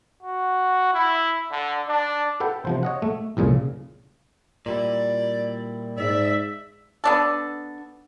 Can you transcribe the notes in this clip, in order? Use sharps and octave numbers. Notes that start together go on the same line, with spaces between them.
F#4
E4
D3
D4
A4 B4 F#5 G5
C3 F3 C5
C#5 D#5 F#5
A3
C2 F2 A#2 C#3
A#2 G3 E4 D5
G#2 D5 E5
B3 D4 A4